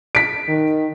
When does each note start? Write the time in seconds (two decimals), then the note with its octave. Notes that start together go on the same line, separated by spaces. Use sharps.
0.15 B6 D7
0.48 D#3